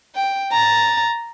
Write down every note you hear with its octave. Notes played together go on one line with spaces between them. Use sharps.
G5
A#5 A6